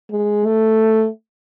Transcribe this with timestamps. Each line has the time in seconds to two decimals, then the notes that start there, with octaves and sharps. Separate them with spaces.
0.11 G#3
0.45 A3